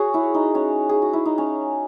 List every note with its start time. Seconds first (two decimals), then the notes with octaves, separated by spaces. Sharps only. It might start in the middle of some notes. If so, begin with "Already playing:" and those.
Already playing: F#4 G#4 C#5
0.14 E4
0.34 D#4
0.55 C#4
0.89 G#4
1.02 F#4
1.13 E4
1.25 D#4
1.38 C#4